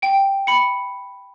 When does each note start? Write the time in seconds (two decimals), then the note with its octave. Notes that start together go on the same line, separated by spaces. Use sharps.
0.02 G5 D7
0.47 B5 C#7